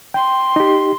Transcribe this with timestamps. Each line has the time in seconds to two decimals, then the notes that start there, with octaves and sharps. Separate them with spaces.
0.14 G5 C6
0.56 D#4 G4